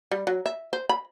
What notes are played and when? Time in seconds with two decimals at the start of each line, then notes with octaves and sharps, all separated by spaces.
0.12 G3
0.27 F#3
0.46 E5
0.73 C5
0.89 B5